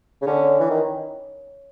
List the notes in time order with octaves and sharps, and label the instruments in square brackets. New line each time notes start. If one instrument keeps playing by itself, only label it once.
[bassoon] C#3
[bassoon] D3 [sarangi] C#4
[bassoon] E3
D#3